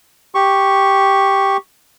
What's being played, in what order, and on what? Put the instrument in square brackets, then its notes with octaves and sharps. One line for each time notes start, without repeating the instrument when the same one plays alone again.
[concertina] G4 C#6